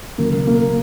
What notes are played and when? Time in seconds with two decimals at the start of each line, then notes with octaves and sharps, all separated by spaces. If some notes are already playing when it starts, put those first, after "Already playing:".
0.18 C#2 B2 F#3 A#3
0.47 A#3